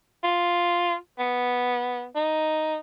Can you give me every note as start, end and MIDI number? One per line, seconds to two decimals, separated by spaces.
0.24 0.95 65
1.19 2.05 59
2.16 2.78 63